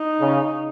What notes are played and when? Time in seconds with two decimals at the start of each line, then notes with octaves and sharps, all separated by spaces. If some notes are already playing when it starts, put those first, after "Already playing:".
Already playing: D#4
0.21 C#3